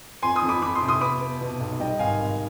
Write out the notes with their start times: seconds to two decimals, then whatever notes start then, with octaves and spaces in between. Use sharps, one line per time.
0.23 F2 G#5 C6
0.35 C6 D#6
0.43 F2
0.49 B5 D6
0.62 F2 B5 D6
0.75 C6 D#6
0.82 C3
0.88 C6 D#6
1.01 B3 B5 D6
1.21 B3
1.41 B2
1.60 B1
1.80 G3 D#5 G5
1.99 G#1 F5 G#5
2.19 G#1